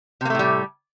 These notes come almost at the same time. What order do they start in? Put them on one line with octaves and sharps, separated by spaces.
C3 A#3 A3 A2 G3